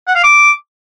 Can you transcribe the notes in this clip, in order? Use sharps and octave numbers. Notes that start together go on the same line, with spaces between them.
F#5
F5
D6